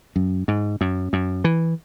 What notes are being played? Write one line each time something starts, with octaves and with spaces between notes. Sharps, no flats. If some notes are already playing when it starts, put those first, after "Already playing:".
F#2
G#2
F#2
F#2
E3